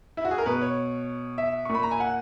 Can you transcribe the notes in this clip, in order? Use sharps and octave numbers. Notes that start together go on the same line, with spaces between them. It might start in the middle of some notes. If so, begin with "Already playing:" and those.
E4
F#4
G#4
A#4
B2 B4
C#5
E5
C#6
A#2
B5
A#5
G#5
F#5